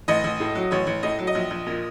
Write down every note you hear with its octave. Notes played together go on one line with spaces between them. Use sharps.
A1 D#5
A1
A2
F#3
A1 C#5
A1
A2 D#5
F#3
D#5
A#1
A#1
A#2